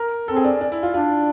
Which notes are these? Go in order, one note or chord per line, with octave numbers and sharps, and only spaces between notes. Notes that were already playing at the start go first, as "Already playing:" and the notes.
Already playing: A#4
C4 A4
G#4
D4
D4
E4
F4
D4 F4